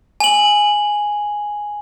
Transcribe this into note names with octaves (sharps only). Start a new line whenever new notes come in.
G#5 F#7